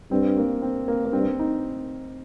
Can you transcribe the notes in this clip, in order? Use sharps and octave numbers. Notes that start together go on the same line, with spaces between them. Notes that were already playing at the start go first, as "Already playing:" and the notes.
G2 C4
A#3
C4
A#3
A#3
G2 C4
D#4